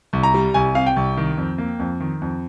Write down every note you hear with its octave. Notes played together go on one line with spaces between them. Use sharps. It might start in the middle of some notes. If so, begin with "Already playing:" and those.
C2
A#5
G3
C2 G#5
C3 F5
G5
C2
D#3
F2
A#3
F2
D#3
F2